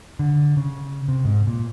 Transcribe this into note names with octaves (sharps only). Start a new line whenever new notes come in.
D3
C#3
C3
G#2
A#2